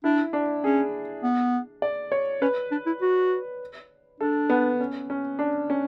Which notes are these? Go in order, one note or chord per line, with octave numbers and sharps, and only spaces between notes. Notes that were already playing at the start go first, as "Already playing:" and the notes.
D4 E4
D4
C#4 G#4
B3
D5
C#5
C#4 B4
D4
E4
F#4
D4 A4
B3
C#4
C#4
D4
C#4